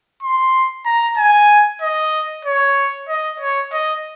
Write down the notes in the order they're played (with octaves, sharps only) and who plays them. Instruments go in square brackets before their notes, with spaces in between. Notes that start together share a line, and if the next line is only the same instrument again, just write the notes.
[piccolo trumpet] C6
A#5
G#5
D#5
C#5
D#5
C#5
D#5